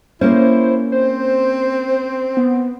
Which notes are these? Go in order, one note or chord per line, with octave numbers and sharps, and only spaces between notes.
A#3 C#4 E4 C5
C4 C5
B3